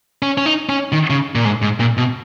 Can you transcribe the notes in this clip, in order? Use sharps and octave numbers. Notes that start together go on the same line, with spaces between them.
C#4
C#4
D#4
C#4
D#3
C#3
A#2
G#2
G#2
A#2
B2